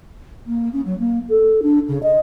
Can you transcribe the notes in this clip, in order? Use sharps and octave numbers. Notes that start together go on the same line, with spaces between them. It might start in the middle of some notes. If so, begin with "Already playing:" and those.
A#3
C#4
F#3
A#3
A4
D4
C#3
D#5